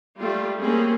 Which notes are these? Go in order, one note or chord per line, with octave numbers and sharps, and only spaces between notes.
G3 A3 F4
A#3 C4 C#4 G#4